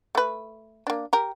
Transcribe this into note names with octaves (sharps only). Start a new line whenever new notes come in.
A3 B4
A#3 D4
G4 A#4